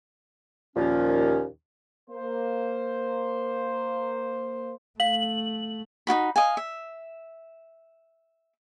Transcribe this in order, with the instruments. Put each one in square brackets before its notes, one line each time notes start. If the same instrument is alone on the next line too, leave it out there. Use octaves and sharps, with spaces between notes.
[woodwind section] D#2 A#2 F3 C#4
[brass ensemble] A#3 C5
[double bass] A3 [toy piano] F5 [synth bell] F#7
[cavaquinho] D#4 F4 F#4 B5
D#5 F5 G#5
E5